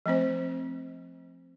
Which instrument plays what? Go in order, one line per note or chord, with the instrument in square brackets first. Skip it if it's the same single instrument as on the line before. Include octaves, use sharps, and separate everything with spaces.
[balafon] F3 A3 C4 C5